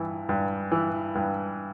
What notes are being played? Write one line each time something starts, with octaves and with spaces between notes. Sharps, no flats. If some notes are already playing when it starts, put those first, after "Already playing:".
Already playing: G2 E3
G2
E3
G2